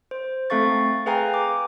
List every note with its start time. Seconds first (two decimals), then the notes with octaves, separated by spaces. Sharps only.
0.11 C5
0.50 A3 C4 A4 F5 C#6 A6
1.06 G#4 B4 F5 G5 G#5 A#5
1.34 D6